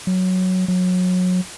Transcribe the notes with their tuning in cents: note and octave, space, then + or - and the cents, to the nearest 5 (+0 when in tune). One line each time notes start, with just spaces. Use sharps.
F#3 +0
F#3 -25